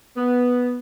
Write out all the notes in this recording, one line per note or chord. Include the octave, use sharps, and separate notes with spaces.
B3